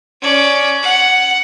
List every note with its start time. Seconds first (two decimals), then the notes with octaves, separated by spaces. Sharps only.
0.22 C#4 D5
0.83 F#5